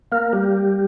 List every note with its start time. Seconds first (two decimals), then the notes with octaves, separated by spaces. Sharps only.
0.12 A#3 A#4
0.33 G3 G4